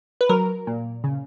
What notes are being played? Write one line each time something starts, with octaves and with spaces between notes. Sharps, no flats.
B4
F#3 A#4
A#2
C#3